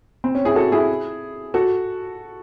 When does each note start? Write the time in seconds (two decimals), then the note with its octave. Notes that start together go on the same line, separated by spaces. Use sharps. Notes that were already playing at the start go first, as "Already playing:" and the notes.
0.24 C4
0.35 C#4
0.45 E4 G#4
0.55 F#4 A4
0.72 E4 G#4
1.54 F#4 A4